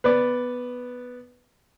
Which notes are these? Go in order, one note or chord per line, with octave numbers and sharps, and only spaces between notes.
B3 B4 D5